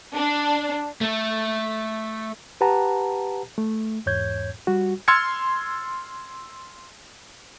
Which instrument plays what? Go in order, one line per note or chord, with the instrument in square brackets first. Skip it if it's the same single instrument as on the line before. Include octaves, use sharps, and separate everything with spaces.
[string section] D4
[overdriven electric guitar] A3
[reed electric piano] G4 B4 F#5 A5 A#5
A3
E2 G#2 C#5 G6 G#6
G3 F#4
[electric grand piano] C6 E6 F6 G#6 A6 C#7